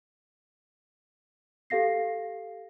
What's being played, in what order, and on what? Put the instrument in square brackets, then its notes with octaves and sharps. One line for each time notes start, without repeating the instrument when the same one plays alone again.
[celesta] G4 A4 F5 A#6 C7